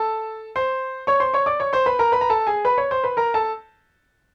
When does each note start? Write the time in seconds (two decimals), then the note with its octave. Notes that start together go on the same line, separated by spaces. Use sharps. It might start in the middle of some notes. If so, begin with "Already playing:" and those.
Already playing: A4 A5
0.56 C5 C6
1.07 C#5 C#6
1.20 C5 C6
1.34 C#5 C#6
1.46 D5 D6
1.60 C#5 C#6
1.73 C5 C6
1.86 B4 B5
1.99 A#4 A#5
2.12 B4 B5
2.21 A#5
2.30 A4 A5
2.47 G#4 G#5
2.65 B4 B5
2.78 C#5 C#6
2.91 C5 C6
3.04 B4 B5
3.17 A#4 A#5
3.34 A4 A5